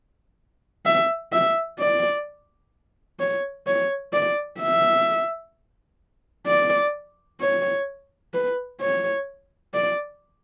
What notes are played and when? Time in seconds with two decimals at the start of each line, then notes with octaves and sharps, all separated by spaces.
0.85 E5
1.33 E5
1.79 D5
3.19 C#5
3.67 C#5
4.13 D5
4.60 E5
6.47 D5
7.40 C#5
8.34 B4
8.81 C#5
9.74 D5